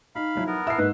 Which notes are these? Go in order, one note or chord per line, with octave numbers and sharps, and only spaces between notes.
D#4 F5 B5
F3 F#3 E4
B3 A#4
E4 E5 A5 E6 C7
G#2 A#3 B4 D#5